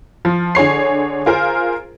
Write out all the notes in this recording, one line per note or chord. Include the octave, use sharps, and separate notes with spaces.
F3
D3 G#4 C#5 C7
F4 G#4 A#4 C5